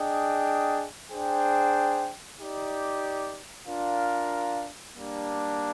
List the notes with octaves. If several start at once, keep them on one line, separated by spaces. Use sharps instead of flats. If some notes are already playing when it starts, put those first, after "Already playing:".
Already playing: D4 G#4 D#5 G5
D4 G#4 C5 G5
D#4 G4 D5
D4 F4 A#4 F5
G3 A#3 D4